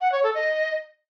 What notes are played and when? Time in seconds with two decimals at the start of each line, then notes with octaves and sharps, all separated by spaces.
0.01 F#5
0.12 C#5
0.23 A4
0.35 D#5